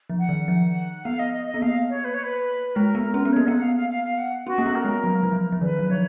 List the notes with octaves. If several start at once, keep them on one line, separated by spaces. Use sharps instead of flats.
F3
F#5
D#3
F3
B3 F5
D#5
D#5
D#5
B3
A#3 F5
C#5
B4
C#5
B4
G#3 A#4
B3
C#4
B3
A#3 C#5
B3 F#5
F5
F5
F5
F5
F#5
C#4 F#4
A#3
B3
A#4
G#3
F#3
F#3
F3
F3
D#3 B4
F#3
F3 C#5